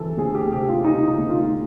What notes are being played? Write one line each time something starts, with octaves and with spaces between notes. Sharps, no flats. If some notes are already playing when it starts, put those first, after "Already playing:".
Already playing: E3 A4
D2 G#4
G4
C3 G4
F4
C3 D#4
D#4
D2
F4